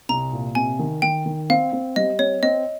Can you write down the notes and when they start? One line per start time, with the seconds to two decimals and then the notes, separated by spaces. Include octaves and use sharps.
0.09 C2 A#5
0.33 A#2
0.55 C3 G#5
0.79 D#3
1.02 D#3 G5
1.26 D#3
1.50 C4 F5
1.73 C4
1.96 G3 D#5
2.19 C4 C#5
2.43 C4 D#5